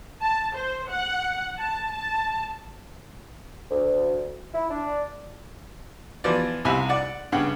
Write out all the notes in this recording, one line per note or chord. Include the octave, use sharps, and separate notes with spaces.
A5
C5
F#5
A5
A5
D2
E4
D4
E3 F3 B3 D5
C2 F2 C3 G#5 B5
D5 F#5
G2 C#3 F#5 G5